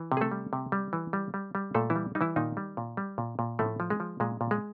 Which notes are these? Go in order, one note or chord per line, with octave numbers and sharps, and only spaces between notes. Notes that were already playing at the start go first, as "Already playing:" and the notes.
Already playing: E3
C3
G#4
A3 A4
G3
C3
G3
E3
G3
G3
G3
A#2 A3 A4
E3 E4
G3
G3 D#4
E3 E4
A#2 D#3 D#4
G3
A#2
G3
A#2
A#2
A2 F3 A3
F3
G#3
F3
A#2 G#3
A#2
G#3